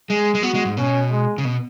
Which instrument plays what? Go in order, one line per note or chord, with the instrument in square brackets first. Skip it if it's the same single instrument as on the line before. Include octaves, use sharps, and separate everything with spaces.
[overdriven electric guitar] G#3 [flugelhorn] G#4
[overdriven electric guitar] G#3
[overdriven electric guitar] B3 [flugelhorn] F#4
[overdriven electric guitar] G#3
G#2
[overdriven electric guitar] B2 [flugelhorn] C#4
[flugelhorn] G#3
[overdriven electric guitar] C#3
B2